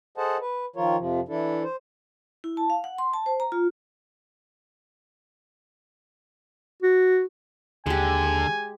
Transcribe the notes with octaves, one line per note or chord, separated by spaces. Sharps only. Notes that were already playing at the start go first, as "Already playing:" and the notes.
G#4 A4 C5 D#5 F#5 A5
B4
D#3 F3 F4 A#4 C#5
F2 C3 F3
E3 D4 E4 A4
C5
E4
A5
F5
F#5
C6
A5
C5
A#5
F4
F#4
D#2 D3 G#3 G4 G#5